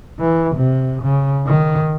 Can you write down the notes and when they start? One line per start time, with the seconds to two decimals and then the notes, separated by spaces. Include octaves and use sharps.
0.20 E3
0.56 C3
1.03 C#3
1.47 D#3